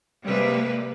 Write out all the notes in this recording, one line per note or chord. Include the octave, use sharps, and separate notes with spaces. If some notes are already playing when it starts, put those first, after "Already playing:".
C3 G3 G#3 A#3 B4